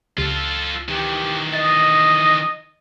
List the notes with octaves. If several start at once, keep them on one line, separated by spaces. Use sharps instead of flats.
C#2 F4 A4
D#3 E3 G4
D#5 A6